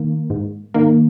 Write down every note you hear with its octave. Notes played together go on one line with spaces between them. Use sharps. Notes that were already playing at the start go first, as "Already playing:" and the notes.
Already playing: D#3 A#3
G#2
D#3 A#3